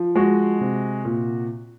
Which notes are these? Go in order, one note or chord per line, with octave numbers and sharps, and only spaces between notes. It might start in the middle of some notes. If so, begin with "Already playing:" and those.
Already playing: F3
G#3 F#4
C3
A#2